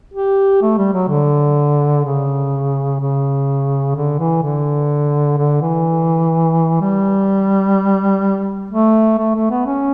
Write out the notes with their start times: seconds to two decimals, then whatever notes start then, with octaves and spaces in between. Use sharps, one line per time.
0.14 G4
0.62 A3
0.78 G3
0.93 F#3
1.09 D3
2.05 C#3
3.00 C#3
3.95 D3
4.19 E3
4.43 D3
5.38 D3
5.62 E3
6.81 G3
8.71 A3
9.19 A3
9.35 A3
9.50 B3
9.66 C#4